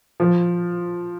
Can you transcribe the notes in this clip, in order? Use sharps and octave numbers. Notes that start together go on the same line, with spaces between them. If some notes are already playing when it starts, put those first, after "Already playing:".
F3